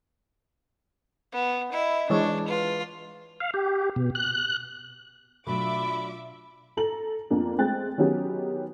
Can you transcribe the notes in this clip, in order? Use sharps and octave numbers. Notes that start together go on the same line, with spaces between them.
B3
E4 D#5
E3 G#3 D4 C#5
F4 B4
F5
G4
B2
F#6
B2 F#3 A3 D4 F4 E5 B5 D6
A4 A#5 F#7
F2 A#3 D4
G#3 A3 C4 G5 F#6 A6
D#3 F#3 B3 C#4 G4 G#4